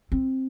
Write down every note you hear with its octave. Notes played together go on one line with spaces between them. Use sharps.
C4